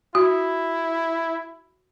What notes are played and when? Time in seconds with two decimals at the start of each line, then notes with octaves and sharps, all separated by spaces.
0.15 E4 F#4